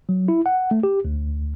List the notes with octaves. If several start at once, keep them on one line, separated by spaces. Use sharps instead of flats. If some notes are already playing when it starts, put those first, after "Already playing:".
F#3
E4
F#5
A3
G4
D2